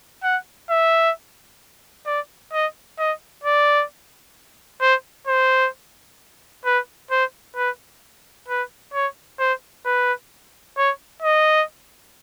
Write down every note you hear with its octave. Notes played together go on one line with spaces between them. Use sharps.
F#5
E5
D5
D#5
D#5
D5
C5
C5
B4
C5
B4
B4
C#5
C5
B4
C#5
D#5